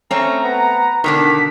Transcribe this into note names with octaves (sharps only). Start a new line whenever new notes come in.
A3 C4 C#4 A#5
B3
B2 D3 D#3 D4 B6